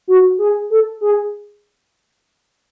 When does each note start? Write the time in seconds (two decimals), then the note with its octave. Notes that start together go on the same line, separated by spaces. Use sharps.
0.08 F#4
0.38 G#4
0.70 A4
1.01 G#4